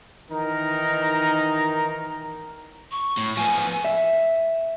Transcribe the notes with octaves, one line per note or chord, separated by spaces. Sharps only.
D#3 E3 D#4 A#4 A#5
C#6
A2
F3 B3 G#5
E5